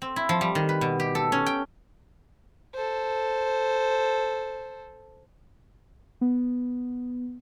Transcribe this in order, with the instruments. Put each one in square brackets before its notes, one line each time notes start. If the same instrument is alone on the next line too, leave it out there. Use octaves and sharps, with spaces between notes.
[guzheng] C4
E4
F3
G3
D#3
B4
B2
G4
A4
C#4
G5
[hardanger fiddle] A4 C5
[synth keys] B3